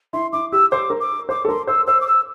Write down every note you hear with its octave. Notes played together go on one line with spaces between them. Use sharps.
E4 C6
E4 D6
G4 E6
C5 D6
A#4
D6
C5 D6
A4
A#4 C6
C5 E6
C5 E6
D6
E6